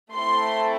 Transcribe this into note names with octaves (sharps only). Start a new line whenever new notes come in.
A3 C4 E4 A4 C6